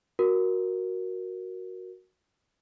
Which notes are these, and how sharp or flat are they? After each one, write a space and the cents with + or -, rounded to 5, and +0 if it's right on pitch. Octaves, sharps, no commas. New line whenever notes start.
F#4 +0 A#4 +5